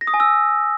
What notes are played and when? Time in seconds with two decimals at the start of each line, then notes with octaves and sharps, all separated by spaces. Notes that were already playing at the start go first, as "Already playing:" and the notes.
0.01 A#6
0.07 D#6
0.14 G#5
0.20 E6